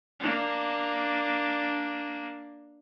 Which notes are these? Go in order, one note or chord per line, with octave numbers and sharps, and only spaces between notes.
A#3 D4